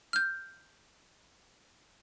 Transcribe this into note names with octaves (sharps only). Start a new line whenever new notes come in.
F6 G6